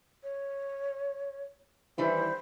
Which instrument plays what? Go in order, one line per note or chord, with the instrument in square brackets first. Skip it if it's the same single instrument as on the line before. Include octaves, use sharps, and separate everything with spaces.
[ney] C#5
[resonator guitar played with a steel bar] D#3 G3 E4 [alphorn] E3 [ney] C5